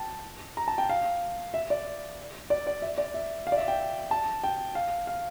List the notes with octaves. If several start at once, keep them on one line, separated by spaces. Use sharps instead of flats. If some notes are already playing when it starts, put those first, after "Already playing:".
Already playing: G5 A5
A#5
A5
G5
F5
E5
D5
D5
D5
E5
D5
E5
F5
D5
E5
G5
A5
G5
F5
F5